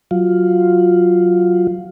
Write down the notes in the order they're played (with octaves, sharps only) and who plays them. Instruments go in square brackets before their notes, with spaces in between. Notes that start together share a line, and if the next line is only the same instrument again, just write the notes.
[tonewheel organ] F#3 F4